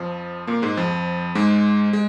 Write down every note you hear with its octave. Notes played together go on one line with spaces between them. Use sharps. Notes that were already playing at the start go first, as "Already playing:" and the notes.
Already playing: F2 F3
A#2 A#3
G#2 G#3
F2 F3
G#2 G#3
G#3